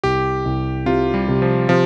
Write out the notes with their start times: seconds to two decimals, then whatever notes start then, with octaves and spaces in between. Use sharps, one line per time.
0.04 C2 G4
0.45 C2
0.86 C3 F4
1.14 G3
1.28 C3
1.42 F3
1.69 C3 F3